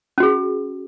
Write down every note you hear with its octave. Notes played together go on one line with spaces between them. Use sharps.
C#4 F#4 G#4